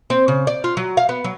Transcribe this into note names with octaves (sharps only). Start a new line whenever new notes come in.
C4
C#3
D5
F4
F#3
F5
B3
F#3